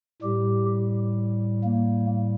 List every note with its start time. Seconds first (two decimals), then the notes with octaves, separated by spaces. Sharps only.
0.22 A2 G3 G4
1.64 A#3